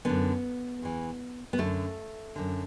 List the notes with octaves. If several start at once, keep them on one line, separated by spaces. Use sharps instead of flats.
F#2 D3 B3
E2 E3
B3
F#2 D3 A3
F#2 D3